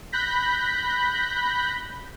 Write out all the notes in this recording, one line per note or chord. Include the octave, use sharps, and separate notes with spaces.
B5 F#6 G6 A#6 B6